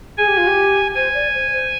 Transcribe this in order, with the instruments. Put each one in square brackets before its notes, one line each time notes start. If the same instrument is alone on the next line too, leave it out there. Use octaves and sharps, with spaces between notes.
[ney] G#4 [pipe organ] G#5
[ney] G4
F4
G4
[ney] C5 [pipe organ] G#5
[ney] D5
C5
C5